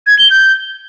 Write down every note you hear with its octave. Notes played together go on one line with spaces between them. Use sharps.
G#6
G7
G6